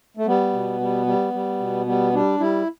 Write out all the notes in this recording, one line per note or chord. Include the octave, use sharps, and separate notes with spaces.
A3
G3 B3
B2
G3
G3
G3
B2
G3 B3
G3 D4
G3 E4